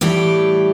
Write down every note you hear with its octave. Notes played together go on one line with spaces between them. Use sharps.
A2 E3 G3 G4